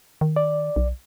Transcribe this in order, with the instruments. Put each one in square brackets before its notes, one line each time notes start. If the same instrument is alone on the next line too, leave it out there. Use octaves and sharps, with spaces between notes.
[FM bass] D#3
[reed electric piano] D5
[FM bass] B1